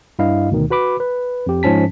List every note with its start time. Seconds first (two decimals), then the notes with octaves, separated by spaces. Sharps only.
0.19 G2 E4 D#5 F5
0.51 D2 B2 D#3
0.70 F#4 B4 B5 D6
1.00 B4
1.47 F2 G4
1.63 G#2 F3 C#4 A5 B6